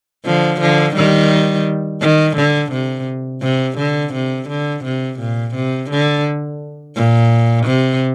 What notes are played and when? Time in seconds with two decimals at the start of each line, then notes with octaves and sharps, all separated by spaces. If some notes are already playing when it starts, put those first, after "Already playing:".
0.25 D3 F3
0.61 D3 F3
0.95 D#3 G3
2.02 D#3
2.37 D3
2.72 C3
3.42 C3
3.78 D3
4.13 C3
4.48 D3
4.84 C3
5.19 A#2
5.55 C3
5.90 D3
6.96 A#2
7.66 C3